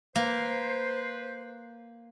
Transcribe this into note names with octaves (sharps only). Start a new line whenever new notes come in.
A#3 B4 C5